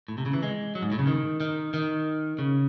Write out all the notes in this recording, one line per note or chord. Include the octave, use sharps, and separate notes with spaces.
A2
C3
C#3
E3
G#3
F#3
G#2
A2
C#3
D#3
D#3
D#3
C#3